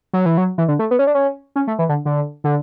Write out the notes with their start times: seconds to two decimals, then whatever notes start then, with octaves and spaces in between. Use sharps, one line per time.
0.13 F#3
0.26 E3
0.38 F#3
0.58 E3
0.68 D3
0.79 A3
0.91 B3
0.99 C#4
1.07 D4
1.15 C#4
1.56 C#4
1.67 A3
1.79 E3
1.89 D3
2.05 D3
2.44 D3